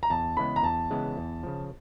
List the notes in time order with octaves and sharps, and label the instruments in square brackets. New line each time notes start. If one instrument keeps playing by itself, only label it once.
[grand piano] A#5
[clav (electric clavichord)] E2 [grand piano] A5
[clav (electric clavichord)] C#3 E3 G#3 B3 [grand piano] B5
[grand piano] A#5
[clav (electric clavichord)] E2 [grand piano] A5
[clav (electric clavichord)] C#3 E3 G#3 B3
E2
C#3 F3